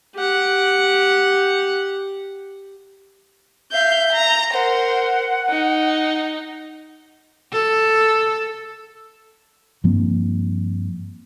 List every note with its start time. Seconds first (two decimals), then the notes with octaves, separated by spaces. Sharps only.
0.16 G4 F#5
3.73 E5 F5 G6
4.13 A#5
4.53 A#4 C5 F#5
5.50 D#4
7.52 A4
9.84 G2 F3 A#3 C4